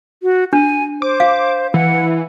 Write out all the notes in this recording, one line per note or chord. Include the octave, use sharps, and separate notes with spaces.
F#4
D4 G#5
C5 D6
F5
E3 F#5